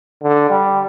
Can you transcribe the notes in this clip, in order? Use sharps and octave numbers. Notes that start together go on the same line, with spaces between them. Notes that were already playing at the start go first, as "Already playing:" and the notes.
D3
G3